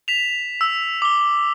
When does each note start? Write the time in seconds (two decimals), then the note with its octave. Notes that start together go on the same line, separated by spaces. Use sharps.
0.08 B6 E7 F7
0.61 E6
1.02 D6 G7